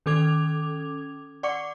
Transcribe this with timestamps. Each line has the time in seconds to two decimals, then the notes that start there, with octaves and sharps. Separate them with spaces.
0.06 D#3 C#4 A4 D6 G#6 F7
1.43 D5 F#5 C#6 D6 C#7